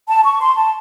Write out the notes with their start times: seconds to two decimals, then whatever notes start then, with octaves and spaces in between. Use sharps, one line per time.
0.08 A5
0.24 C#6
0.40 C6
0.56 A5